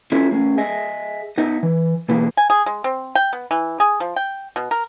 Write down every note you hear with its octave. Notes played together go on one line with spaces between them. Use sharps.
C#4 E4 F4 G#4 A4 E5
A3 C#4 G#4
G#4 D#5 E5 G#5
B3 D#4 D#5 E5
E3
B2 E3 A#3 E4 G#4
G#5
G#4
G#3
C4
G5
B3
E3
G#4
F3
G5
B2
A#4